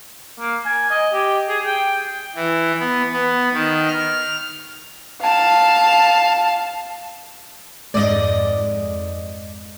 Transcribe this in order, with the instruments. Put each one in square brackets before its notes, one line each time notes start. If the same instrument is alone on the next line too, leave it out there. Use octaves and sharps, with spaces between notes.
[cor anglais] A#3
G#5
D#5
G4
G#4
G5
[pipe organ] E3
B3
B3
D#3
F6
[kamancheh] F5 A5
[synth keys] F2 G#2 G#3 [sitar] D5 D#5